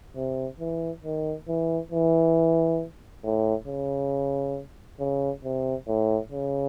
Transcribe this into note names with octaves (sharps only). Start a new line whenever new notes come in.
C3
E3
D#3
E3
E3
A2
C#3
C#3
C3
A2
C#3